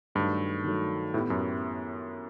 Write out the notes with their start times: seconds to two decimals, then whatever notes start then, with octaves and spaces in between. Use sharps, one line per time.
0.15 G2 D#3 F#3 A3
0.64 D#3 F#3 A3
1.14 A2 B3 E4 G4
1.30 F#2